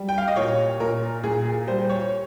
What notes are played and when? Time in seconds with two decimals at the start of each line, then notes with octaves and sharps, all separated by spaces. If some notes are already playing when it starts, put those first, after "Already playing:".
Already playing: G3
0.09 G5
0.18 F5
0.28 D#5
0.36 A#2 C#5
0.80 A#2 A#4
1.23 A#2 G#4
1.45 G#4
1.67 G3 C5
1.89 C#5